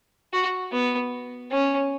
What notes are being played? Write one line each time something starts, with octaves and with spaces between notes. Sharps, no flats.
F#4
B3
C#4